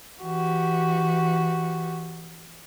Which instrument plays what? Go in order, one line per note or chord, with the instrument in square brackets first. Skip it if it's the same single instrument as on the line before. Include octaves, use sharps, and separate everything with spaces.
[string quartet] E3 F#4 G4